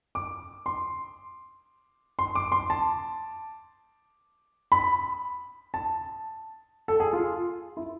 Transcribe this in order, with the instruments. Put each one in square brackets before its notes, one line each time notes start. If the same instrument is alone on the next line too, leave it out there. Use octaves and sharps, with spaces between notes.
[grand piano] D6
C6
C6
D6
C6
A5
B5
A5
A4
G#4
F4
E4